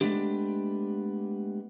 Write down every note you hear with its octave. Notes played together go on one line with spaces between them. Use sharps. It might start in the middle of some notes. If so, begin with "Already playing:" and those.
G#3 A3 B3 D4 G4